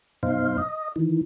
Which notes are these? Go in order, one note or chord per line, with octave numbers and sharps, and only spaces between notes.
F#2 B2 D#4 C5 F5
D#5
D#3 E3